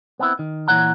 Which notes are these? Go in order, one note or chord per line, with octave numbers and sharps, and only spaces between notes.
B3 C4 E4
D#3
A#2 E3 C#5 F#5 A#5